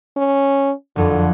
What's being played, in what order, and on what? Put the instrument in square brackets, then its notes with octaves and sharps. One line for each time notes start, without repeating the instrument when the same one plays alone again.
[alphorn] C#4
[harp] F#1 F2 [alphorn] D3